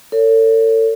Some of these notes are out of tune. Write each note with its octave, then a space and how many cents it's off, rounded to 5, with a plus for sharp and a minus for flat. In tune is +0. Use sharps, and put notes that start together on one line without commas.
A4 +40 C#5 +25